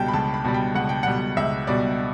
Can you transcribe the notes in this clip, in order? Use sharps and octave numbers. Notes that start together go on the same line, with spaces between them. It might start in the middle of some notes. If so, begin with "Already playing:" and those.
Already playing: C#2 B2 G3 G5 A5
B5
C#2 A5
B5
B2 G3
G5
C#2 F#5
G5
B2 G3 F#5
C#2 E5
B2 G3 D5